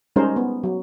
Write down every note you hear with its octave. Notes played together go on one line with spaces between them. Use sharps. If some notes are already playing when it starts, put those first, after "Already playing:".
G3 G#3 C#4 D#4 A#4 C5
B3
F#3